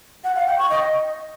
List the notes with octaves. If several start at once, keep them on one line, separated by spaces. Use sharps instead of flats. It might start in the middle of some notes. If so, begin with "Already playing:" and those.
F#5
F5
G5
C#6
D#5